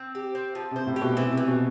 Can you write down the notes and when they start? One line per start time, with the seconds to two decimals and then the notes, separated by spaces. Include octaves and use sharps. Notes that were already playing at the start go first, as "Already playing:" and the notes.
Already playing: C4
0.15 G4
0.35 C4
0.55 F3
0.71 C3
0.76 C5
0.86 A2
0.96 G4
1.02 B2
1.17 C3 E3
1.32 C3
1.37 E3
1.48 B2